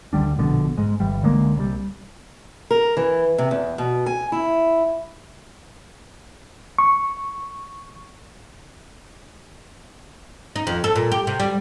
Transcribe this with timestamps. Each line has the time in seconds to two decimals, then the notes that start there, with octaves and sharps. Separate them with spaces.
0.13 D2 D3 G3 D4
0.39 A#1 B2 D3
0.77 G#2 G#3
1.00 G1 E3 G3
1.23 C#2 D3 G#3 A#3
1.56 C2 G3
2.71 A#4
2.97 E3
3.38 C3
3.51 E2
3.78 B2
4.06 G#5
4.32 E4
6.78 C#6
10.56 D#4
10.67 F2
10.84 A4
10.96 A#2
11.12 G4
11.27 C3
11.40 G3